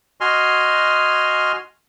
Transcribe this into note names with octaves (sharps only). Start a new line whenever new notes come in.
F#4 D#5 G#5 C6 F6